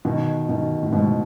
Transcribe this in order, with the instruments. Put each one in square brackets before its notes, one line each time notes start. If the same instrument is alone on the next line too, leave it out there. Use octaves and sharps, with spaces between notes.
[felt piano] B2 D#3
B2 D#3
A2
G#2 B2